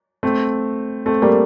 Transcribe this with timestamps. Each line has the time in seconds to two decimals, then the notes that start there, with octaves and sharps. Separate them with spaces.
0.23 A3 C4
1.06 A3 C4
1.22 G3 A#3